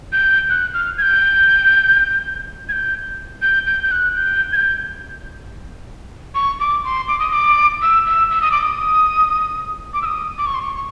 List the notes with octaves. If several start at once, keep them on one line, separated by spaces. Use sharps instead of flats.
G6
F#6
F6
G#6
G6
G#6
G6
G6
G6
G6
F#6
G6
G#6
G6
C#6
D6
C6
D6
D#6
D#6
D6
E6
E6
E6
D#6
D6
D#6
D6
E6
D#6
D6
C#6
C6
C#6
C#6